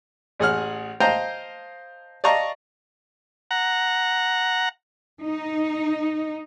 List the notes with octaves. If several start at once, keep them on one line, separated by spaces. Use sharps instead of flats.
A1 G#4 F#5 F6
C5 D#5 F5 G5 A5 A#5
D5 D#5 F5 A5 A#5 C#6
F#5 A#5
D#4